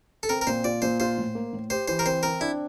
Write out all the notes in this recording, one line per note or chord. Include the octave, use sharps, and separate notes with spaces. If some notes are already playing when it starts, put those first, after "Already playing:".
A4
C4 A#4
A#4
A#2 C5
F4 D5
A#2 C5
F4 C5
A2
A#3
A2
G4 C5
E3 C5
A#4
C4 C5
C4 A#4
D4 E4